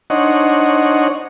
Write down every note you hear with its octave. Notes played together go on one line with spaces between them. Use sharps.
D4 D#4 C5 C#5 D#5 F#5